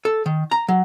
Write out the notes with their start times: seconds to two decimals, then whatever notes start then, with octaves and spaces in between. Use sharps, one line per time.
0.05 A4
0.26 D#3
0.51 A#5
0.68 F#3